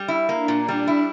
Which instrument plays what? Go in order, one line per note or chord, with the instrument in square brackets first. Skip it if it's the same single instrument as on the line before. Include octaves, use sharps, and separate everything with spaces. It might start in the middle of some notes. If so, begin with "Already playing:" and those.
Already playing: [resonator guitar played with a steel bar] G3
E4
[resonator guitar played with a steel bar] A#3 [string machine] D4
[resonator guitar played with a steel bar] A#2
G3
E4